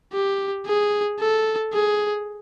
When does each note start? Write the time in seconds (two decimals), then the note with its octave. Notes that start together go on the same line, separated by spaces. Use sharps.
0.13 G4
0.66 G#4
1.20 A4
1.73 G#4